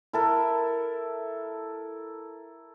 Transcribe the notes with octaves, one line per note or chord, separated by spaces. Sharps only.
E4 A4 A#4